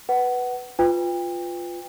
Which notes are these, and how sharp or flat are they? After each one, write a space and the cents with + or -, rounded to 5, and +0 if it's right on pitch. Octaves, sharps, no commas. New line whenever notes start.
B4 +0 F#5 +15
F4 +0 B4 +20 G5 +30